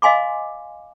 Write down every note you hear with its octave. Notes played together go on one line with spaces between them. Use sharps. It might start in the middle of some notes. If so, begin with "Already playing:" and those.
D#5 F5 G#5 C6 D6